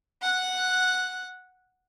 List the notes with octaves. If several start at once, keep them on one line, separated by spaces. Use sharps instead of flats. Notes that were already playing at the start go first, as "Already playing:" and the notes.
F#5 F#6